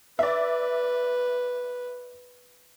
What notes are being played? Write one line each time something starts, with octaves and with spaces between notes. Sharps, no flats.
B4 D5 E5